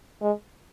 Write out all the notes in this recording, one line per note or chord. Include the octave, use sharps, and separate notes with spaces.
G#3